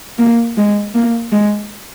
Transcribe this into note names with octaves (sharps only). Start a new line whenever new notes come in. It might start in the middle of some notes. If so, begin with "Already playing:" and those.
A#3
G#3
A#3
G#3